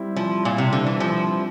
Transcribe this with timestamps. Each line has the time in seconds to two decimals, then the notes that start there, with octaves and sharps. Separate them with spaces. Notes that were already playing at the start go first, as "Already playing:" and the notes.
Already playing: G3 C4 E4
0.16 F3
0.45 A#2
0.58 C3
0.72 D3
0.86 E3
1.00 F3